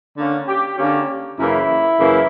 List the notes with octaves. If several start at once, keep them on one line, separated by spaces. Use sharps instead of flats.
D3 A#3 C#4
G4
D3 A#3 C#4 G4
F#2 C#3 E3 A#3 E4
F#2 C#3 E3 A#3